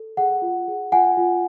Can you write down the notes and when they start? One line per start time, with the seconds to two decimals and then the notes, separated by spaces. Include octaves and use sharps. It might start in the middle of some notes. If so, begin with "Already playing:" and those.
Already playing: A4
0.17 G#4 F#5
0.42 F4
0.68 G#4
0.92 F4 F#5 G#5
1.17 F4